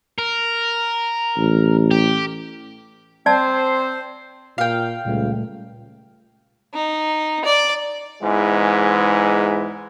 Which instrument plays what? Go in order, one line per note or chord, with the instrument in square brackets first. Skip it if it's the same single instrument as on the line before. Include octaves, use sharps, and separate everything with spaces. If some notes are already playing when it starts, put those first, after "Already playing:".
[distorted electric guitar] A#4
[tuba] A1
[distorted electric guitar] G4
[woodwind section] C4 C5 [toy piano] D5 A5
[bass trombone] A#2 [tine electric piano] F4 [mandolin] F5 G5
[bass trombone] C#2 [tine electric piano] A#2 G3 A3
[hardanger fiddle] D#4
D5
[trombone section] E2 G#2 E3 G#3